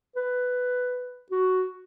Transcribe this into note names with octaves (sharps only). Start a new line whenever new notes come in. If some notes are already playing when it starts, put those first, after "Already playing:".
B4
F#4